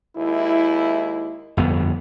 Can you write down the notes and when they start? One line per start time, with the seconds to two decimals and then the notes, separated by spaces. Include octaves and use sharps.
0.16 D#2 G#3 E4
1.57 G1 F2 B3